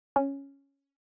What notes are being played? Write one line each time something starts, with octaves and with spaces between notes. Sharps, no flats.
C#4